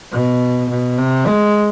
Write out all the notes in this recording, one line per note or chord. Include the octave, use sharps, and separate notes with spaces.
B2
B2
C3
G#3